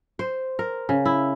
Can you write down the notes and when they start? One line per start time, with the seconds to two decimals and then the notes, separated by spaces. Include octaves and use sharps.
0.19 C5
0.59 A#4
0.89 C#3
1.06 E4